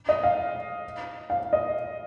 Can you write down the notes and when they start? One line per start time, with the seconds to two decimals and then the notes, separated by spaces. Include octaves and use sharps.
0.09 D#5
0.23 F5
1.30 F5
1.53 D#5